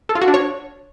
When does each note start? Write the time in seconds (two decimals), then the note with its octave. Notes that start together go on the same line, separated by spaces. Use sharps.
0.09 A4
0.15 F4
0.22 F#4
0.28 D4
0.34 C#5